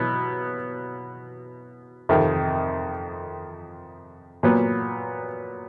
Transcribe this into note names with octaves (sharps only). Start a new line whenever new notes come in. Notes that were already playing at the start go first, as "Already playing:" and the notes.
Already playing: B2 F#3 B3 E4
F2 C3 D#3
A#2 F#3 B3